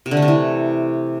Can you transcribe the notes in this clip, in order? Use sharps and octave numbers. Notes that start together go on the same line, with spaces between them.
C3
D3
A3
C3
E3